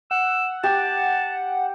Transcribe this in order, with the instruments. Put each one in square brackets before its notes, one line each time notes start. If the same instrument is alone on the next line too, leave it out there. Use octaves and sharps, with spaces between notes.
[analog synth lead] F#5 [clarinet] E6
[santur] G4 [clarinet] A5